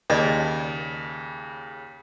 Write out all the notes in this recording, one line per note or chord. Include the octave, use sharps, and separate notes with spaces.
D#2 C#3 D5 D#5